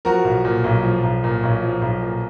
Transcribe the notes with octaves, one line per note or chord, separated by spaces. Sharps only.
F3 F#4 A#4
B1
A#2
B1
F3
B1
A#2
B1
F3
B1
A#2